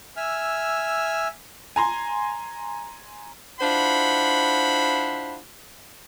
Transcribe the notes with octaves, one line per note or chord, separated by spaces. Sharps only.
E5 G#5 E6 F6
G#5 A#5 C6
D4 E4 F4 C5 F#5 B5